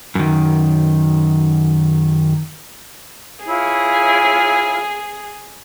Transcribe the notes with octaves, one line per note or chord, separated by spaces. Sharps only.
F#2 D#3
E4 F4 G#4 C#5